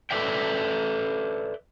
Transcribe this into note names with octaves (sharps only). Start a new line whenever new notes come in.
A4 B4 D5 E5 G5